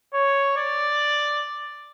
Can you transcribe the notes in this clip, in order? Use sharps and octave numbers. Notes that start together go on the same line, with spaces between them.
C#5
D5